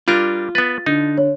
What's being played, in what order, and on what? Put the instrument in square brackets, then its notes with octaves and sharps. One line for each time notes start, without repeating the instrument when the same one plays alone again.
[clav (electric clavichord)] G3 D4 A#4 [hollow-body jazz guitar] F4
[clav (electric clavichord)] B3 B4 [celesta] A6
[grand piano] D3 [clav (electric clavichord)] D#4
[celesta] C#5